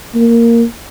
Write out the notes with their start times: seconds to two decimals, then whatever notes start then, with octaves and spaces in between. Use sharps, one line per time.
0.15 A#3